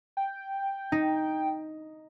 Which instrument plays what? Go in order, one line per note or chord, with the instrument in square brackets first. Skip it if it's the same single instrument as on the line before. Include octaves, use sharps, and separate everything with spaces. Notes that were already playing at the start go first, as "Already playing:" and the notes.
[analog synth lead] G5
[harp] D#4